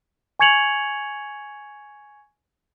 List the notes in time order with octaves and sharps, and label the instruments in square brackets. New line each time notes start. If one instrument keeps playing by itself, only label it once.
[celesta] G#5 C#6 G#6 C#7 F7 F#7